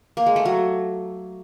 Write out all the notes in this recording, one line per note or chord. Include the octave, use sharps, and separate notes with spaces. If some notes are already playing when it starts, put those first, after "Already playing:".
A#3
G#3
A3
F#3